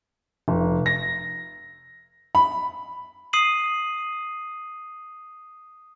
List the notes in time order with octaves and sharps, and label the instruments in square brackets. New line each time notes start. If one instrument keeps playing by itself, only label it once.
[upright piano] F1
A#6
B5
[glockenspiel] D#6 C7 D#7 F#7